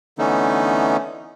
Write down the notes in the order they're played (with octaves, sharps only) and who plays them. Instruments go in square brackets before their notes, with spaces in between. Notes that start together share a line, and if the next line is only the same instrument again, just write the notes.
[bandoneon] D3 E3 A3 B3 C#4 D#4